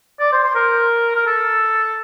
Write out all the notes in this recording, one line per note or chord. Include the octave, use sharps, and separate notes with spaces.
D5
C5
C5
A#4
A#4
A4